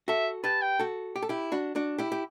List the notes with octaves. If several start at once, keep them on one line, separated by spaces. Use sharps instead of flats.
F#4 A4 E5
G4 B4 A5
G5
F#4 A4
G4
A4
E4 G4
D4 F#4
D4 F#4
E4 G4
G4